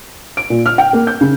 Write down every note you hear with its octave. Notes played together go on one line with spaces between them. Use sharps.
D7
A#2
F6
G5
A#3
G6
C#3